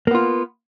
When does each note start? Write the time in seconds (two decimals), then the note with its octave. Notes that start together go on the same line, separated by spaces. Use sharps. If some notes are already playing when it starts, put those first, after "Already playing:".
0.07 A#3
0.11 B3
0.15 F4